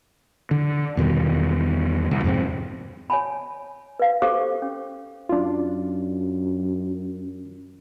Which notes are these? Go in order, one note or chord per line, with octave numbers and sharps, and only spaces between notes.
D3
E2 B2 D#3 G3
C2
F2 G#2 C3 C4
C#5 G#5 A5 B5
B4 F5
G4 A4 C5 F5 C#6 D6
C#4
F#2 D4 F4